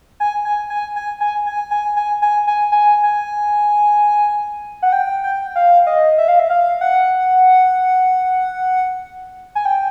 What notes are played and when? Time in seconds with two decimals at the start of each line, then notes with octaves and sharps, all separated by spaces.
0.20 G#5
0.45 G#5
0.70 G#5
0.96 G#5
1.20 G#5
1.46 G#5
1.71 G#5
1.96 G#5
2.22 G#5
2.47 G#5
2.72 G#5
3.03 G#5
4.82 F#5
4.93 G5
5.24 G5
5.56 F5
5.87 D#5
6.18 E5
6.28 F5
6.39 E5
6.50 F5
6.81 F#5
9.55 G#5
9.65 G5